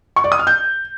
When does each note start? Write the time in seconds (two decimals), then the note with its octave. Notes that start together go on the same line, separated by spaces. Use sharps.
0.16 C#6
0.24 D5
0.32 D#6
0.39 F6
0.47 G6